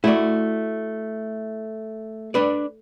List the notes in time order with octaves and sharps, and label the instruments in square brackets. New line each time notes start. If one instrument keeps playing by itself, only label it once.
[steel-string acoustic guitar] A3 [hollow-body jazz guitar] E4 F#4 D5
[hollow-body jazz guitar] D4 B4 D5